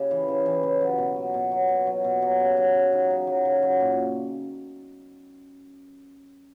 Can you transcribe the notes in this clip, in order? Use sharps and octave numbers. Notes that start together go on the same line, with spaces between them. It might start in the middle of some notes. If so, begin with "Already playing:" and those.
Already playing: C#3 G4
E3
C#3
E3
C#3
F#3
B2
F#3
B2
F#3
B2
F#3
B2
F#3 G4
C#3
F#3
C#3
F#3 D#4
C#3
F#3
C#3
F#3
A#2